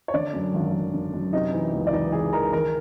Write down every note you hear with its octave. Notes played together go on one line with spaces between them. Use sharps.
C#5
D3 D4 D5
F#2
G#1
G#1
D3
F#2
C3 D#4 D#5
E3
C#2
D5
E3 D#4 D#5
E3 G#4 G#5
E3 A#4 A#5
D#3 A#4 A#5